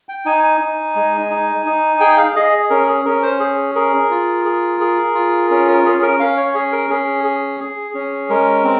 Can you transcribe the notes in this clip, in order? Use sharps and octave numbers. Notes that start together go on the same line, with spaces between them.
G5
D#4 G#5
G#5
D#4
G#3
D#4
D#4
G#4 G5
F5
G#4 D#5
C#4 A#4
G#4
C#4 A#4
C5
G#4
G#4 A#4
F4
G#4
G#4
F4
C#4 A#4
A#4
C#4 G#4
A#4
C#4 F5
C#5
G#4
A#4
C#4 G#4
G#4
G#4
C#4
G#3 A#4
C4